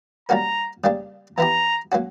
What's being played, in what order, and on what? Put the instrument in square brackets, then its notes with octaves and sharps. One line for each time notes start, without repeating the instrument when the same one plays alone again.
[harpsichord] G3 A#3 C#4 F#4 A#4 [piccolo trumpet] A#5
[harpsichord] C#3 G3 A#3 D4 G4
[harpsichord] E3 B3 E4 G4 [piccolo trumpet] A#5
[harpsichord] F#3 A#3 C#4 F#4